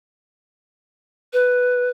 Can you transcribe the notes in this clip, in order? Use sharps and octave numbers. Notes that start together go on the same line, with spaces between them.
B4